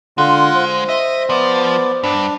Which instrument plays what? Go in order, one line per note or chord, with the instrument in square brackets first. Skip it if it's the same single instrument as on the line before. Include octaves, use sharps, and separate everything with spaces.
[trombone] D3 [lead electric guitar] G#3 [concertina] F4 F#5
[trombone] C5
[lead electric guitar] D#5 [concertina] E5
[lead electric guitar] F3 [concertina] B3 D5
[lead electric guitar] G2 [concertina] D4